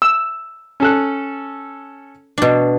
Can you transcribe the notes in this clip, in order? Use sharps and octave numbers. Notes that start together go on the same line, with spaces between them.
E6
C#4 A4 F#6
B2 D4